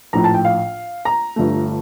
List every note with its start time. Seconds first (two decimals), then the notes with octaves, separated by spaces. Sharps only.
0.13 A#1 A2 F3 A#5
0.24 A5
0.34 G5
0.45 F5
1.05 A#5
1.36 G1 G2 F3 A3